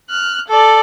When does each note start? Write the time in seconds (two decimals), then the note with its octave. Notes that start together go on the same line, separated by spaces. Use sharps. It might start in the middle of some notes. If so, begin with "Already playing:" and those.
0.10 F6 F#6
0.48 A4 D5